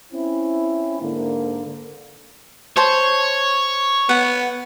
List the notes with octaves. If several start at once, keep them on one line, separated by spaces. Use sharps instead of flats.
C4 C#4 E4
G#2 D3 A#3
C5 C#5 A5 C6
B3 F#5